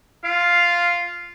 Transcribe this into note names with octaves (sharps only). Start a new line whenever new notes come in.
F4 F5